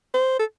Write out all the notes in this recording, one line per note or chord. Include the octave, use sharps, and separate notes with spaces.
C5
A4